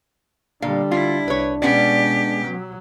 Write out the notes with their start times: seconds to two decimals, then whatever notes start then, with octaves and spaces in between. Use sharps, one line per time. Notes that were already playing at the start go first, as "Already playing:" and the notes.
0.62 A#2 D3 G3 D4 F5
0.91 E4 F4
1.28 C2 B4 C#5
1.62 B2 G#3 B3 C#4 G4 D5
2.46 F#3